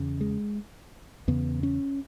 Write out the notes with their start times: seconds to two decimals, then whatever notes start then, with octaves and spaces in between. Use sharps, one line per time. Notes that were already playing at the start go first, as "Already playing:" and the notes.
Already playing: E2 C#3
0.21 G#3
1.28 E2 C#3 B3
1.63 C#4